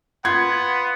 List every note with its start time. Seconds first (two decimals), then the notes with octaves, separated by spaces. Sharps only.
0.25 B3 F4 F#5 G#6